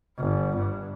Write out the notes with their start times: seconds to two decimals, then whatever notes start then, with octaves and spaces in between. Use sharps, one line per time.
0.19 G1
0.57 G2